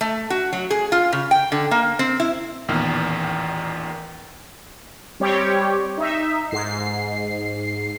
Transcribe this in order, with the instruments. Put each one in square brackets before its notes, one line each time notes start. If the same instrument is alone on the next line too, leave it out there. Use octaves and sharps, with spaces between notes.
[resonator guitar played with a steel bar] A3
F#4
F#3
G#4
F4
C#3
G5
D3
A#3
C4
E4
[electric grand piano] A1 E2 A#2 D#3 F6
[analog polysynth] G3 C4 G4 C#5
D#4 E5
G#2 C7